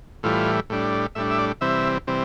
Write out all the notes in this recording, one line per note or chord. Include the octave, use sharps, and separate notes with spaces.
A2 E3 G3 F4
A2 G3 D4
A2 G3 D4 E5
E5
D5
C3 E3 G3 C4 E5
C3 E3 G3 C4